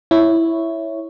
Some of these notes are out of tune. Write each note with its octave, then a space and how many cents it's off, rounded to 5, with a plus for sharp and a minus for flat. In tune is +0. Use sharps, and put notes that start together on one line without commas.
E4 +0 C#5 +0